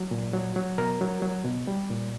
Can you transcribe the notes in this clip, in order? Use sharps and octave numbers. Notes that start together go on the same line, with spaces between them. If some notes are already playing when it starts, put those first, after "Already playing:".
Already playing: F#3
A#2
F#3
F#3
B2 A#4
F#3
F#3
B2
G3
A#2